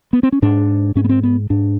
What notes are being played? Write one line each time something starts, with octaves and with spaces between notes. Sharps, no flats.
B3
C4
C#4
G#2 D4
G#2 C#4
B3
C4
B3
G#2 D4